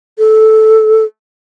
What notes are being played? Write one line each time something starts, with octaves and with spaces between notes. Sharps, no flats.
A4